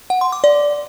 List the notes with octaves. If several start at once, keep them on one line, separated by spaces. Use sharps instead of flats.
F#5
C6
D6
D5